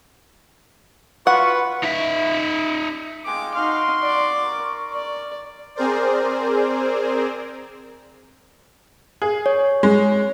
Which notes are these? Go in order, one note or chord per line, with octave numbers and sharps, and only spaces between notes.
F4 F#4 B4 F#5 C#6
D#4 E5
G#3 F4 G5 D6
D#4 F#4 F5 C6
D5 D6
A#4 C#6
D5
C4 G#4 A#4 C5 D5
G#4
C#5
G#3